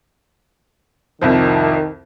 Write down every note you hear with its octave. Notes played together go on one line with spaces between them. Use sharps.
C2 F2 D#3 F3